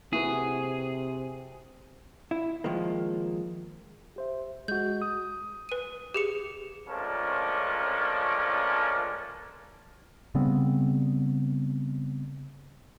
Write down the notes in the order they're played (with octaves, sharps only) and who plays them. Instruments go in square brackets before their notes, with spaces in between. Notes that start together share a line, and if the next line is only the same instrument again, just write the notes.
[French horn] C3 [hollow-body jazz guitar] E4 F#4 B4 [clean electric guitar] G#4
[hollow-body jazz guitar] E4
D#3 F3 G#3 A#3
[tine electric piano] G4 C5 E5
[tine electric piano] G#3 F#4 [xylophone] G6
[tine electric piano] D#6
[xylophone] B4 D#7
G4 G#4 C#7
[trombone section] C#2 F3 A3 C#4 D4 A#4
[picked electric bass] C#3 G3 B3 C4